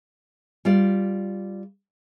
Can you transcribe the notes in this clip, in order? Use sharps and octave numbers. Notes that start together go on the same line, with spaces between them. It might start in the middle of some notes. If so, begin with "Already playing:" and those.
G3 F4 D5